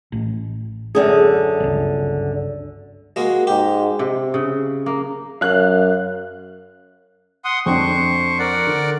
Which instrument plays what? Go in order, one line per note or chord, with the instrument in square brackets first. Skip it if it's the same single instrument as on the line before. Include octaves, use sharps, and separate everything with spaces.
[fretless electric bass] A1
[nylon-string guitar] F#2 D3 G#4
[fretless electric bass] G1 C#2
[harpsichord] G#3 A#3 [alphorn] F#4
[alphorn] G#2 [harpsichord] G4
[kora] C3
C#3
A#3
[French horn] F#2 [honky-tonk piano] F5 F#6
[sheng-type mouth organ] F#5 C6 D#6
[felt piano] F2 C4 D4 [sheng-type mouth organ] C5 C#6
[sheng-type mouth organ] A#4 D5 F#5
[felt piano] D3